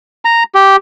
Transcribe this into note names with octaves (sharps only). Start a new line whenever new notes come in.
A#5
G4